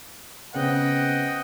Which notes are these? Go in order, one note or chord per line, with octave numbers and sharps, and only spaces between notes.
C#3 B3 C4 D#5 F#5 G5